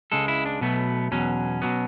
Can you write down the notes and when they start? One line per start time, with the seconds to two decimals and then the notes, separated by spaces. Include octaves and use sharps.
0.12 C#2 C#3 G#3 A4
0.28 E4
0.46 D4
0.61 B1 B2 F#3 A3 B3
1.11 E2 B2 F#3 C#4
1.62 B2 F#3 B3